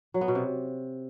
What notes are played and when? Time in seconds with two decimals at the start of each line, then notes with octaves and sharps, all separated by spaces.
0.14 F#3
0.21 B3
0.28 B2
0.35 C3